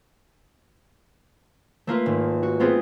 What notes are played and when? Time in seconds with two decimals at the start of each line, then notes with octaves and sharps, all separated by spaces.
1.87 A3 A#3 F4 B4
2.06 G#1
2.43 F#4
2.60 A3 B3 C4 F4 G#4